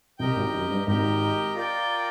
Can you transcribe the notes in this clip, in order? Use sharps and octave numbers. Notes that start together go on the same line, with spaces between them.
C2 C3 G4 A#4 D#5 G5
G#1 G#2
F#2
G2
G#1 G#2 G4 A#4 D#5 G5
F4 A#4 D5 G5